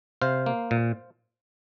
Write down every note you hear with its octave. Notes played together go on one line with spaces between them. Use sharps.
C3 C5 F5
A#3
A#2